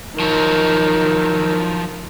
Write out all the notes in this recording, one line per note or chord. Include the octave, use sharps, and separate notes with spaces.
D#3 F3 F#3